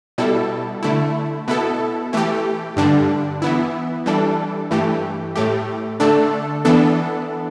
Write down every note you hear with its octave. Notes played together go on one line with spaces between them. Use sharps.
B2 G3 E4 A4
D3 A3 E4
B2 B3 E4 A4
E3 A3 G4
G2 D3 G3 D4
E3 B3 E4
E3 G3 D4 A4
G2 E3 A3 G4
A2 A3 G4
D3 A3 D4 A4
E3 B3 D4 A4